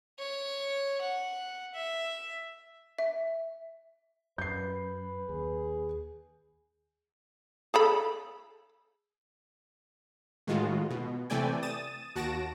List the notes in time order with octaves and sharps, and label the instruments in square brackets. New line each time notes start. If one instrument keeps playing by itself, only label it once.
[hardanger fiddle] C#5
F#5
E5
[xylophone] E5
[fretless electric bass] F#2 [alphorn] B4 [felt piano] G6 C7
[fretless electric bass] D#2 [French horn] G#4
[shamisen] G#4 A4 B5
[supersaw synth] A2 D#3 G#3 F4 F#4
B2
C3 E3 A3 D5 G5 G#5
D#6 A6 D#7 E7
D#2 F#4 A5 A#6 D7 E7